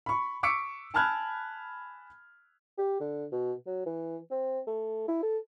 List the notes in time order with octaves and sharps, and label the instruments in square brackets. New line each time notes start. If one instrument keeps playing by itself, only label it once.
[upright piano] B5 C#6
C#6 D6 E6 B6 C#7 D7
G#5 A5 B5 F6 F#6 G#6
[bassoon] G4
D3
B2
F#3
E3
C4
A3
E4
A4